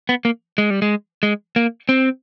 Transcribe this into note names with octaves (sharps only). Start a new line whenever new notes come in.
B3
A#3
G#3
G3
G#3
G#3
A#3
C4